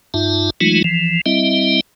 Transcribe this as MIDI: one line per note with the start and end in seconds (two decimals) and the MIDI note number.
0.14 0.50 43
0.14 0.50 63
0.14 0.50 65
0.14 0.50 76
0.14 0.50 81
0.61 0.82 52
0.61 0.82 54
0.61 0.82 56
0.61 0.82 57
0.61 0.82 63
0.61 0.82 65
0.84 1.21 52
0.84 1.21 53
1.26 1.81 55
1.26 1.81 60
1.26 1.81 64
1.26 1.81 75
1.26 1.81 76